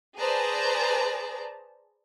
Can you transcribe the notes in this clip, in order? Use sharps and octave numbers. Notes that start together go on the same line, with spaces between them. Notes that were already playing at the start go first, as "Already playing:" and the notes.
G#4 B4 C5 D5 A5 A#5